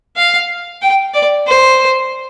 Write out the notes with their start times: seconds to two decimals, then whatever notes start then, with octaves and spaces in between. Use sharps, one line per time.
0.16 F5
0.82 G5
1.14 D5
1.47 C5